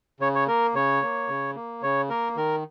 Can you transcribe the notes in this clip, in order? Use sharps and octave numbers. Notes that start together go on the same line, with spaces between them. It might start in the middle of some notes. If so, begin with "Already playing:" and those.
C#3 C#5
C#5
A#3 A#4
C#3 C#5
A#3
C#3
A#3
C#3 C#5
A#3 A#4
D#3 A#4